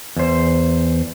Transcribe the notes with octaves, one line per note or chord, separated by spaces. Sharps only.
E2 C5